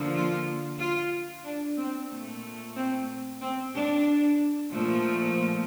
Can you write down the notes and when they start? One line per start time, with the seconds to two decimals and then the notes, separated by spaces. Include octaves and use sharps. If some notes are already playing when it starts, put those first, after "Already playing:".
Already playing: D3 F3 A#3
0.14 F4
0.79 F4
1.45 D4
1.78 C4
2.10 A#2 A3
2.76 C4
3.42 C4
3.75 D4
4.73 A#2 F3 A3